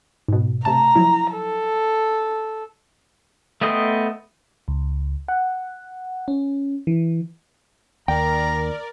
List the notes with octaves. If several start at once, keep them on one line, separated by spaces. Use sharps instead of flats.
G#2 B2
C3 A3 A5 A#5
F3 F#3 E4
A4
A3 B3 D#5 G5 C6
C#2
F#5
C#4
E3
D#2 A#4 D5 G5 A#5